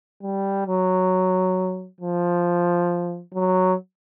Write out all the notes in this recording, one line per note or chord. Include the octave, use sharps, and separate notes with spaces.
G3
F#3
F3
F#3